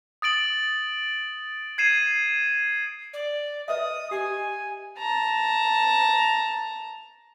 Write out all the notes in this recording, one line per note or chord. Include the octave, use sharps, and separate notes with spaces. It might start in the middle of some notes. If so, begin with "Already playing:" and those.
D#6 A6 D7 F#7
G#6 C7 D#7 E7
D5
B4 D#5 E5 D#6
G4 G#5
A5 A#5